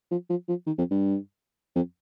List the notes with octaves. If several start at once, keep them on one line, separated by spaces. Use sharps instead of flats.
F3
F3
F3
D#3
F2
G2
F2